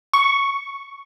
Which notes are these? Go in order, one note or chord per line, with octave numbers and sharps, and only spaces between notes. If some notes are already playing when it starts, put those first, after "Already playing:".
C#6